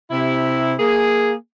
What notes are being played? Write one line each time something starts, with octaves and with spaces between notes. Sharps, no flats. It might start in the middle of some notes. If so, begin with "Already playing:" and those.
C3 E4
A#3 G#4